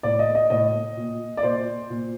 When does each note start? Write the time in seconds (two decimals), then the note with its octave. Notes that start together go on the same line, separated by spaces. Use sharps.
0.03 A2 D5
0.19 D#5
0.35 D#5
0.50 A2 D#5
0.97 A#2
1.37 D5
1.43 A#2 C5
1.90 A#2